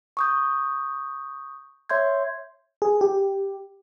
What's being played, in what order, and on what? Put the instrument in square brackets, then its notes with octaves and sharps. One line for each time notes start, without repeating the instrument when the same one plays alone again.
[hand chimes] C#6 D#6 G6
C#5 E5 C6 G6 G#6
[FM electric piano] G#4
G4